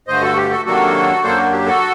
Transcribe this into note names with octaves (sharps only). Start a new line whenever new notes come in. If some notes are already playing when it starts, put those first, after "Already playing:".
G2 D3 A3 C5 D#5
F#4 A4
G4
F#4 A4
C3 D#3 F#3 A#3 D4 F#4 A4
F#2 F#3 A#3 D4 A4 C5
F#4
G4
F#4 A4